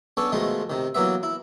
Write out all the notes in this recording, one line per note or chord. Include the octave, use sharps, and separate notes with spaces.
B3 C#4 D4 A4 C#5
B2 D#3 F3 G#3 A3
C3 D#3
E3 F#3 A#3 B3 E5
E4